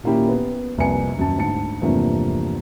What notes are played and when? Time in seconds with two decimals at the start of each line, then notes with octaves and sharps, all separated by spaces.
0.03 A#2 D#3 A#3 C#4 E4 G4
0.29 B3
0.78 C2 F2 A#3 B4 G#5 C#7
1.17 D#1 F#2 A5
1.37 D2 G#2 A5 C#7
1.81 E2 G2 C3 F3 A3 A#3